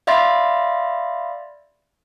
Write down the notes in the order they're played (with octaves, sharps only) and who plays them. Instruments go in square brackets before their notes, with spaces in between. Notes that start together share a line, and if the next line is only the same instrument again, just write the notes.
[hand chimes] D5 E5 F5 B5 C6 A6